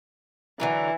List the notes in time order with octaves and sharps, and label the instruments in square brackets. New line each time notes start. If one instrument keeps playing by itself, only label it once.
[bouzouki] D3 F#3 A#4 [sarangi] E3